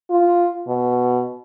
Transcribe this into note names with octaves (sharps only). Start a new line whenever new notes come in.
F4
B2